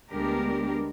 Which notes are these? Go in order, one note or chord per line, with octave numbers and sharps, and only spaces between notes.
D2 G#3 B3 D4 G4 A#4